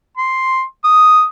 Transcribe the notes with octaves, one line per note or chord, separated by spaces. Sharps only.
C6
D#6